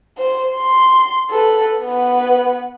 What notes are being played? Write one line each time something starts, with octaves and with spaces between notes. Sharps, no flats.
C5
C6
A4 B4
B3 B4